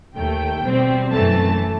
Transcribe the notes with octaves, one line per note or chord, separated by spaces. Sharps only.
D#2 D#3 A3 G5
B2 G3 C4
F#2 E3 A3 A5